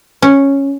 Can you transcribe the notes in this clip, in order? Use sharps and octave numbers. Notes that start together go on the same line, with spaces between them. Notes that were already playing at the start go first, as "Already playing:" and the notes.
C#4